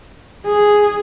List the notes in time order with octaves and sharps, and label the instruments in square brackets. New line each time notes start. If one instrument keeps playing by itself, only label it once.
[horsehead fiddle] G#4